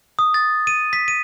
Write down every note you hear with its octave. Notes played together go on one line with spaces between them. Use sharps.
D#6
A6
D#7
B6
D#7